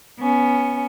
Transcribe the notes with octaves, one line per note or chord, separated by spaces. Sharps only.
B3 C#4